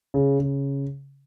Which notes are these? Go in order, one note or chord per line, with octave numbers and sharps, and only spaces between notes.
C#3
C#3